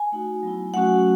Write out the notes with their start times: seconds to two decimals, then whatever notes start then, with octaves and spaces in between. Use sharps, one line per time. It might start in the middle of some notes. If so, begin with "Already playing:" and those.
Already playing: G#5
0.12 A3 D#4 F#4
0.43 F#3 B3 E4
0.74 F#3 A3 C#4 F#4 F#5